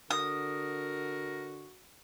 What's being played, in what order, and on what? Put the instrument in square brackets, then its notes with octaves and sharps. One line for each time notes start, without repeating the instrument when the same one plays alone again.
[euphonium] D3 [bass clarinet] F#4 [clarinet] A#4 [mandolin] D#6